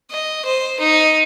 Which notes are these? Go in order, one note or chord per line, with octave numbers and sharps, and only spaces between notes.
D#5
C5
D#4